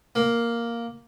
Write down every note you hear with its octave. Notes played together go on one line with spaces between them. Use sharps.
A#3